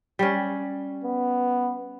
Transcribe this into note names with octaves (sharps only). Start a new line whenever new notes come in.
G3 C#4
B3